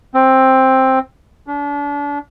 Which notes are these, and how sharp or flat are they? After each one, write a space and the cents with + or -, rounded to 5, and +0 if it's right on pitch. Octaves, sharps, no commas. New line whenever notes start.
C4 +10
D4 -35